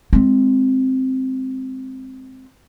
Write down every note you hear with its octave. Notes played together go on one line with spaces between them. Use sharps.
G#3 C4